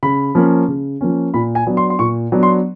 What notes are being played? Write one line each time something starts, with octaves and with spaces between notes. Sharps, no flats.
C#3 B5
F3 A#3 C#4
C#3
F3 A#3 C#4
A#2 B5
G#5
F#3 B3 D4
C6
C6
A#2 C#6
F#3 B3 D4
C6